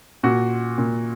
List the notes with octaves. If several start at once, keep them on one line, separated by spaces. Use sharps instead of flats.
A#2 F#4
A#2